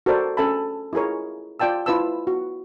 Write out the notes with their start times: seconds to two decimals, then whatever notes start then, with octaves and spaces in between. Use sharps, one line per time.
0.06 F#4 A4 A#4 C5 D5
0.37 C#4 A4 E5 G#5 A5 B5
0.93 E4 F4 G#4 A#4 C#5
1.60 F4 D5 G5 A5 E6
1.86 E4 F4 B4 A5 E6
2.27 F#4